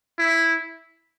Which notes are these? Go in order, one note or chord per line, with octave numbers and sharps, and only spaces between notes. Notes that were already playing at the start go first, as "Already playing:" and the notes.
E4